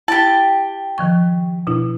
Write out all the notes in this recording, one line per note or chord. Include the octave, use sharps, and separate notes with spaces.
E4 G4 A5
D#3 F3 C#6
B2 D4 E4